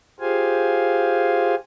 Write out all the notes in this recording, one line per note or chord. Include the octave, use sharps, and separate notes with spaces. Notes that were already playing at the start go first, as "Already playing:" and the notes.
F4 G4 G#4 C5 F5 G#5